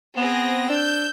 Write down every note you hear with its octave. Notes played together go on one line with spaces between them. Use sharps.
B3 C4 G#4 A#6
D4 E6 G6